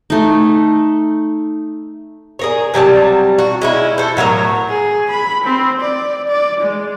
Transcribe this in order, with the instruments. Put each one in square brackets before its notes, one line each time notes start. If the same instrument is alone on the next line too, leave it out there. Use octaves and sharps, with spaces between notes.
[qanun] A3 D#4
[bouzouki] G#4 A#4 C#5
C3 F#3 G3 A5
F#4
G#3 C#4 E4
A4 C5
A2 F#3 A#4 C#5
[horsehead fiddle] G#4
B5
C4
D5
D5
G#3